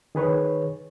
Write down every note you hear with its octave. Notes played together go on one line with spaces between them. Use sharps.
D#3 G#4 B4 C#5